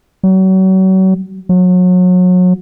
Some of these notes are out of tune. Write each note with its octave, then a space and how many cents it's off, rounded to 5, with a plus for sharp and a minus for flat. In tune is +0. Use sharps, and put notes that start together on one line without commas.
F#3 +35
F#3 -30